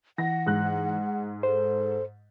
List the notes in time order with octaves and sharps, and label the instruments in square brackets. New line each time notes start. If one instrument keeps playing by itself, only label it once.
[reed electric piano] E3 [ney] F#5 [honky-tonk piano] A#6
[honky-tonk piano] G#2 F#6
[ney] A4 [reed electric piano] C5